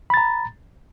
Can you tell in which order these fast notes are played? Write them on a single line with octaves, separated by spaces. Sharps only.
B5 A6 A#5